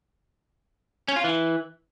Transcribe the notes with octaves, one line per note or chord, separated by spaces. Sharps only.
C#4
F4
E3